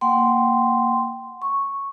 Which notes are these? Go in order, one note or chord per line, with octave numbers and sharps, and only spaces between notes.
A#3 F#5 G5 C6
C#6